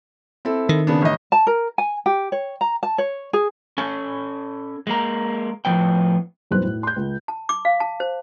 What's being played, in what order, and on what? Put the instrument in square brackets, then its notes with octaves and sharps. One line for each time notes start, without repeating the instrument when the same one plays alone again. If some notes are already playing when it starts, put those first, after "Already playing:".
[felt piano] C4 E4 A4
[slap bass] D#3
[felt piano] C#3 B3 D4
A1 D#5
[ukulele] A5
A#4
G#5
G4
C#5
A#5
A5
C#5
G#4
[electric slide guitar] C#4 A4 G#5
G#3 A#3 A#5
A2 F3 B3 G5
[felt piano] B1 E2 G2 B4 C5 F#6
A2
C6 G6
C#2
[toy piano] A5
D6
F5
A5
C5